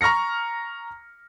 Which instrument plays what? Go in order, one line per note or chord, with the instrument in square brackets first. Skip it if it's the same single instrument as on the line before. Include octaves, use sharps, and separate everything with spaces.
[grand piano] A#5 C#6 F6 A#6 C#7